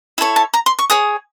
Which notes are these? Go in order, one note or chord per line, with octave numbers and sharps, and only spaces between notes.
E4 A4 C#5 E5
A5
A#5
C6
C#6
G#4 C#5 D#6